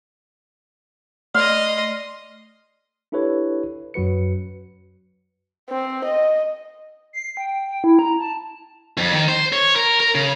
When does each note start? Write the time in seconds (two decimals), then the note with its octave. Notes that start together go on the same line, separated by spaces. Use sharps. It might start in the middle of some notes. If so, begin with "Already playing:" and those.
1.34 A3 D5 D#5 F5 C6
3.12 D4 E4 G4 A4 B4 C#5
3.94 F#2 F#3 F#4 B4 C#7
5.70 C4
6.05 D#5
7.13 C7
7.37 G5
7.70 G5
7.84 E4
7.99 A#5
8.19 A5
8.97 F2
9.12 D#3
9.29 C5
9.53 C#5
9.76 A#4
10.00 A#4
10.15 C#3